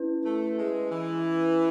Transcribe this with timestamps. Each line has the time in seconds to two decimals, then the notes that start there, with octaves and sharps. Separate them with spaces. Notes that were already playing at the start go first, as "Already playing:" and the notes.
Already playing: C#4 E4 B4
0.24 A3
0.57 G#3
0.90 E3